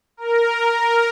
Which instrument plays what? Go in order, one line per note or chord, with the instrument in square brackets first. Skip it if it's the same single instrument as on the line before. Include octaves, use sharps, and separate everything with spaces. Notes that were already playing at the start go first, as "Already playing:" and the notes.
[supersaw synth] A#4